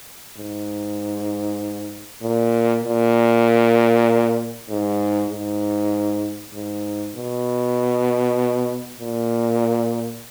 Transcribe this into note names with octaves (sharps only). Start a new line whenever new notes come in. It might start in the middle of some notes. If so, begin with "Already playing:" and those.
G#2
A#2
A#2
G#2
G#2
G#2
B2
A#2